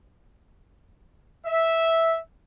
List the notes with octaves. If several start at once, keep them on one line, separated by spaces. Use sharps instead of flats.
E5